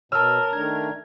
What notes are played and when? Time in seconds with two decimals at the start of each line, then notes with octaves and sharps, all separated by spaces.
0.12 B2 A#4 C#5 A5 E6 F6
0.53 D#3 A3 D4 G#6